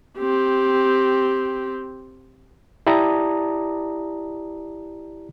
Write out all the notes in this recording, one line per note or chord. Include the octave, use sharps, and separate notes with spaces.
C4 G4
E4 G4 D5 A5 A#5 D#6